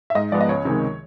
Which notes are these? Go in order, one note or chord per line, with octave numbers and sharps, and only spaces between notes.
E5
G#2 D#5
F3 G#3 B3 D5
D#5
C#2 C#5
C3 D#3 G#3